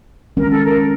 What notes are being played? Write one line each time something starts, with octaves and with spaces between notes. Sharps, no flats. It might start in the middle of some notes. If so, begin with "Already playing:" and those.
D#3 G#3 C#4 A#4
A4
A#4